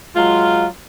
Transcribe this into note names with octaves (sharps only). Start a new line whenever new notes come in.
F#3 G#3 F4